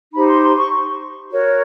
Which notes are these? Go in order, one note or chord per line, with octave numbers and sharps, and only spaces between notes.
D#4 G4 C5 B5
C6
C6
C#6
F#4 A#4 C#5